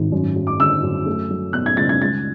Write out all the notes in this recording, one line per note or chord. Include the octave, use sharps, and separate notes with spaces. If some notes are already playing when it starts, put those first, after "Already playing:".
Already playing: G#1
F#2
F#3
D6
D3 E6
F#2
A3
F#3
B2 F#6
G#6
C#2 A6
G#6
C#2 A6